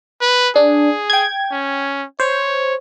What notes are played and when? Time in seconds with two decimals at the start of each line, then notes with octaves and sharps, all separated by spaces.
0.21 B4
0.56 D4 G#4
1.10 G5 G#6
1.51 C#4
2.20 C5 C#5